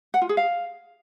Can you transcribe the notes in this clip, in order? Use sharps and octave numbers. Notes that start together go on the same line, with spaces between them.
F#5
F4
G#4
F5